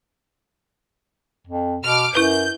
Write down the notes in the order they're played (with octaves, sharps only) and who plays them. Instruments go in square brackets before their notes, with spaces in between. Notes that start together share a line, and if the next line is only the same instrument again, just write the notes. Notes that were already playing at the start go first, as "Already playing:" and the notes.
[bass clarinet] F2
[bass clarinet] B2 [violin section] D6 F6
[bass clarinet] F#2 [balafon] E4 B4 [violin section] G6